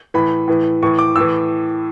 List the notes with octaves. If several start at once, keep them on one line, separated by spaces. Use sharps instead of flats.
A2 E3 B5
A2 E3
A2 E3 C#6
D6
A2 E3 E6